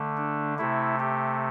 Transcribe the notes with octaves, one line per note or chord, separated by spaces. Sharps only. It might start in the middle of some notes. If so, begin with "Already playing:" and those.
Already playing: D3 A3
D4
C3 A3 E4
G4